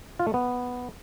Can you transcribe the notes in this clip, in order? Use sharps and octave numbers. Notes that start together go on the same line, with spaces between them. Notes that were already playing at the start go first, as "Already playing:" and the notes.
F4
A3
B3